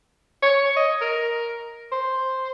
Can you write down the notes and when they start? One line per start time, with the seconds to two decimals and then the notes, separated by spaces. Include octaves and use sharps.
0.43 C#5
0.76 D#5
1.01 A#4
1.92 C5